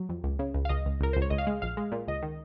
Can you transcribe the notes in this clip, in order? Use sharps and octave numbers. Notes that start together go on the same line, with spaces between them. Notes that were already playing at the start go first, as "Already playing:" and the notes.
Already playing: F#3
F2
C#2
C#3
C#2
F5
C#2 D#5
C#2
C#2 A#4
C#2 C5
C#5
C#2 D#5
F5
G#3
A#1 F5
G#3
A#2
C#2 D#5
D#3